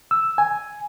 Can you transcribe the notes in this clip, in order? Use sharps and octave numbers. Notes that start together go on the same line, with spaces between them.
E6
G#5